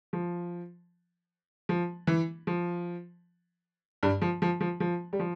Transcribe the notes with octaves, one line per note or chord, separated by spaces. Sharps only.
F3
F3
E3
F3
G2 G3
F3
F3
F3
F3
G3
F3